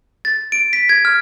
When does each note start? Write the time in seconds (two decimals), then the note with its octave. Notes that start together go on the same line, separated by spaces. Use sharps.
0.25 A6
0.52 D7
0.73 B6
0.89 G#6
1.05 F6